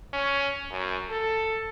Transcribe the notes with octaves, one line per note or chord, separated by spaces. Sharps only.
C#4
F#2
A4